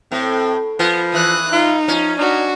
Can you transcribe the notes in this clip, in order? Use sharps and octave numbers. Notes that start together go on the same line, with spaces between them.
A2 C4
F3 B3
E3 D#6 F#6
D#4 F4
F3 C#4
D4 D#4 F#4